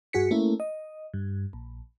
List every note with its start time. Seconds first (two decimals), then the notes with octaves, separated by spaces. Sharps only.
0.13 G2 F#4 G#4 B6 C#7
0.31 A3 A#3 C#4 E4
0.60 D#5
1.14 G2
1.53 A#1